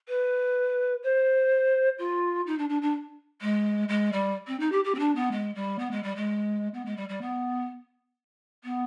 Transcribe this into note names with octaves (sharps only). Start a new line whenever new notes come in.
B4
C5
F4
D#4
D4
D4
D4
G#3
G#3
G3
C4
D#4
G4
G4
C4
D4
B3
G#3
G3
B3
G#3
G3
G#3
B3
G#3
G3
G3
B3
B3